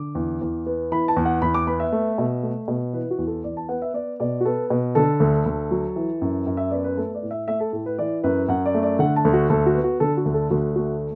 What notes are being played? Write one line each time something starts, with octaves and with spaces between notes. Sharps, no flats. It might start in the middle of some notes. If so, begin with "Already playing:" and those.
Already playing: D3 D6
E2
E2
B3
E3 B5
A5
E2
F#5
E2 B5
D6
B3 B5
E5
A3
B2
A3
B2
E3 B4
F#4
E2
A4
E2 D5
A5
B3 F#5
E5
B3 D5
B2 D5
F#4
B3 A4
B2
D3 A4
D2
D2
F#3
E3
F#2
F#2
E5
B3 D5
B4
A3 A4
D5
A2
E5
A3 E5
A4
A2 A4
B4
E3 D5
F#2 B4
F#2 F#5
D5
A3
D5
D3 F#5
A5
D2
F#4
D2 A4
F#4
B3
F#4
D3 A4
F#4
D2
A4
D2 F#4
A3 F#4